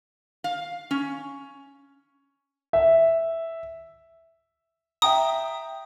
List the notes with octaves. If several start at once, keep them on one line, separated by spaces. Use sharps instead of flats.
F5
C#4
E5
E5 G5 A#5 D#6